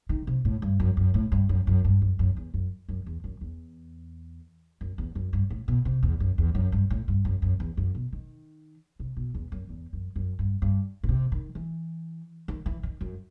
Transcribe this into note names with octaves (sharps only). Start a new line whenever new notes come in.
D#3
C3
A2
G2
F#2
F#2
A2
G2
F#2
F#2
G2
F#2
F#2
E2
F#2
F#2
E2
F#2
E2
F#2
E2
F#2
G2
A2
B2
C3
E2
F#2
E2
F#2
G2
A2
G2
F#2
F#2
E2
F#2
B2
D#3
C3
B2
E2
F#2
E2
F#2
F#2
G2
G2
B2
C3
D#3
E3
D#3
E3
D#3
F#2